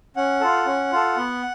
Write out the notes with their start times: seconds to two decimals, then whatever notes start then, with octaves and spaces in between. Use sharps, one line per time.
0.16 C#4 F#5
0.41 F4 A4
0.66 C#4
0.92 F4 A4
1.17 B3